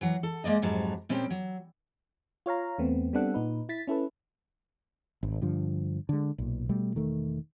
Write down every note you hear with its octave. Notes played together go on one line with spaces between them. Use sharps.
E3 F#3 F#5
A4
G#3 A#3 D5 D#5
F2 G#2 F#3 G3 A5
A#2 G3 C4 C#4 G4
F#3
F4 C#5 F5 A#5
E2 A3 B3 C4
G3 B3 C4 D4 A4 F#5
A#2 D#4 B4
E4 A6 B6
C#4 E4 A4 B4
G#1
G2 D3 F3
D3 G#3
B1 A#2
B2 G3 A3
E1 D#3 A3